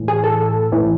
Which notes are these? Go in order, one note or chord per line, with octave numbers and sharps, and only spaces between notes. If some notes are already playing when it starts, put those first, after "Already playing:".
Already playing: A2 E3
G#4
A4
A2 E3